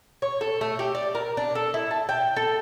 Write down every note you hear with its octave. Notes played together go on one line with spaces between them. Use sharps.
C#5
A4
A3
G4
D5
A#4
D4
A4
E4
A5
G5
A4